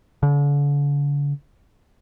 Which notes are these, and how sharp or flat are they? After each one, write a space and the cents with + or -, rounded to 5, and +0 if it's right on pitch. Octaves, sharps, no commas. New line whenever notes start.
D3 -40